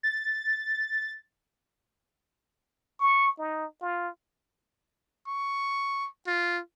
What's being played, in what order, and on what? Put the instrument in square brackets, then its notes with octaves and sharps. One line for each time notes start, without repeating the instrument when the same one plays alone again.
[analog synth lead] A6
[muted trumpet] C#6
D#4
F4
C#6
F4